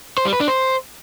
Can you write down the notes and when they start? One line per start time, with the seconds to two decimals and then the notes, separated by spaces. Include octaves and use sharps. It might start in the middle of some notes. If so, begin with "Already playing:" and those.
0.18 C5
0.25 G3
0.33 B4
0.40 D4
0.48 C5